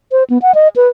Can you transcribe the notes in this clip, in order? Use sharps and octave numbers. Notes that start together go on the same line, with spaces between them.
C5
B3
F#5
D#5
B4